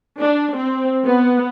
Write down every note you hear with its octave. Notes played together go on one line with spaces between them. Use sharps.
D4
C4
B3